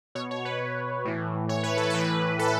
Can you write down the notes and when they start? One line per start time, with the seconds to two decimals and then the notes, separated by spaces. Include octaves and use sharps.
0.15 B2 C#5
0.31 C#5
0.45 B4
1.05 A2 E3
1.49 C#5
1.63 B4
1.77 A4
1.90 A2 E3 B4
2.39 A4